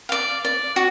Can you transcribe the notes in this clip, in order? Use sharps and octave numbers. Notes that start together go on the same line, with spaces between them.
D5 F5
D5
F#4